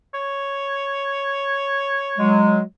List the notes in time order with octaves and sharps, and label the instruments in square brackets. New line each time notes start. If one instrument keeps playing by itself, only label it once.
[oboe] C#5
[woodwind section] F#3 G#3